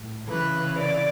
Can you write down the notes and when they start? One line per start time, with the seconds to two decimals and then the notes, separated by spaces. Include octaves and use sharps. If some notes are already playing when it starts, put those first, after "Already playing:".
Already playing: A2
0.28 C#3 E3 B4
0.78 D5